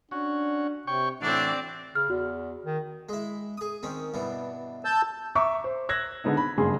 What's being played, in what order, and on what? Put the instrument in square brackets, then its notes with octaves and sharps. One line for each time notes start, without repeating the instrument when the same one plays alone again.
[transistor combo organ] C#4 F#4 [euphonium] D4
[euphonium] C3 [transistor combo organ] C#5 G5 C#6
[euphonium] A2 [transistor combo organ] E3 F#4 [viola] C4 D5 [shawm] D4
[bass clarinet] C#3 [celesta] F6
[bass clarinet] E2 [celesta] F#4
[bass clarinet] D#3
[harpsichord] G#3 E4
G#4 D#6
D#3 C4 C#4
G2 B2 E3
[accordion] A5 E6 G6
[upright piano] E5 A#5 C#6 D6
C5
E6 F#6 G#6 A#6
D3 G#3 B3 D#4
B5
F#1 G2 C#3 G#4 C6